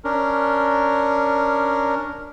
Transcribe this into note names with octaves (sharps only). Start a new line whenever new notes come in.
C#4 D4 A#4